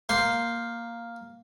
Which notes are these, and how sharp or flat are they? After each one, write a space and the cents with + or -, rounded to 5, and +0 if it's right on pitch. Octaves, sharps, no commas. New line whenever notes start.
A#3 +0 G5 +0 C6 +0